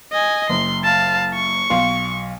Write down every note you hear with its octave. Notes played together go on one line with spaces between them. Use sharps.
D#5 G#5
F#1 C6
F5 A5
C#6
B1 F5 C6